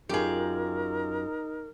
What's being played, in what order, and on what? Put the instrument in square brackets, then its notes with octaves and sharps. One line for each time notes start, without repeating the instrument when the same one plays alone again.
[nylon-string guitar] F#2 F4 [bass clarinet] D#4 [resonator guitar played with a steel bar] G4 G#4 [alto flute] A#4